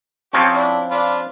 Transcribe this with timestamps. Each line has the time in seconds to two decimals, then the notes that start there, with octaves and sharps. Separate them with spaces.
0.33 F3 C4 C#4 G4 C#6
0.53 D4 E4
0.91 D4 F4 B5